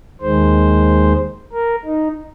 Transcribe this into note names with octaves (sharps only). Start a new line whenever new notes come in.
D#2 D#3 G#3 C5
A#4
D#4